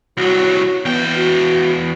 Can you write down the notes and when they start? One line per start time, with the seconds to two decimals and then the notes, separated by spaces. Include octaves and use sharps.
0.17 C2 F#3 F#4
0.85 E2 B3 G5
1.16 F#4